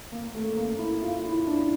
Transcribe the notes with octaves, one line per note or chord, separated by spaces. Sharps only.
A#3
A3
A#3
E4
F4
E4
D4
E4